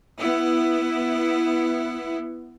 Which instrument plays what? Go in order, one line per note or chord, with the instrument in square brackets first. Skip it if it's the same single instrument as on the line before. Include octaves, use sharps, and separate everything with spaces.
[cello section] B3 E4